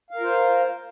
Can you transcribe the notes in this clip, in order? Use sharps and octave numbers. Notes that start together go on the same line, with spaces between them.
F4 A#4 C5 F5